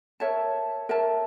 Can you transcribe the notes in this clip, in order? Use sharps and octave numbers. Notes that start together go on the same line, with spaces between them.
A#4 C#5 E5 A5
A#4 C#5 E5 A5